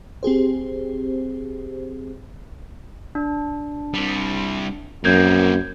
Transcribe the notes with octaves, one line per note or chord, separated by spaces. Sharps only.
C4 G4 G#4 C5
D4
C3 G3
F#2 A#3 C4 G6 G#6